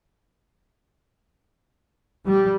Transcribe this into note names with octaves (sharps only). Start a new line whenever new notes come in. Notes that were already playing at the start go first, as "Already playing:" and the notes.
G3